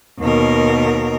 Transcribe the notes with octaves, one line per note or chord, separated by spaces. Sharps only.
D#2 B2 A#4